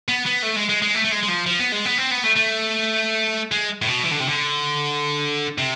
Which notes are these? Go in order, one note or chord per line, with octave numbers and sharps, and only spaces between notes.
B3
B3
A3
G#3
G#3
G#3
A3
A3
G#3
G#3
F3
F3
B3
G#3
B3
C4
B3
A3
A3
G#3
A2
B2
E3
D3
C3
D3
C3